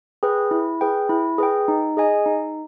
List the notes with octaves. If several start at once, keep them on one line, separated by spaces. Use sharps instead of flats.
G#4 B4 G5
E4
G#4 B4 G5
E4
G#4 B4 G5
D#4
G#4 D#5 G#5
D#4